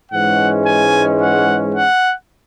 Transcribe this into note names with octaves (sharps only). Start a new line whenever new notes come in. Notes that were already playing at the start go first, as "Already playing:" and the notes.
G#2 E3 G#3 C#4 F#5
G#5
F#5
F#5